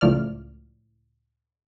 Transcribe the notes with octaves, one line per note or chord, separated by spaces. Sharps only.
C#2 A2 F3 D5 F6